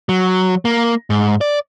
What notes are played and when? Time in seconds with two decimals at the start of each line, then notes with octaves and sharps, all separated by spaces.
0.09 F#3
0.65 A#3
1.10 G#2
1.41 D5